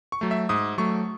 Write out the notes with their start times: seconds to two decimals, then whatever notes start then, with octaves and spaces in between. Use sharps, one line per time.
0.12 C#6
0.21 F#3 A3
0.31 E5
0.49 G#2 D#6
0.78 F#3 A3 C#6